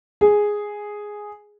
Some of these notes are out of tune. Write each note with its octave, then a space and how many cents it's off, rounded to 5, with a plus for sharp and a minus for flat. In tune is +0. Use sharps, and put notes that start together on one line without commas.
G#4 +0